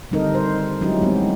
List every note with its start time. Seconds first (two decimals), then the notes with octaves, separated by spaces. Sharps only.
0.11 D3 G3 C4 D#4 A4 A#4
0.35 C5
0.81 F#3 G#3 C#4 D#4 E4 G4
1.02 G3 G#3 B3 C4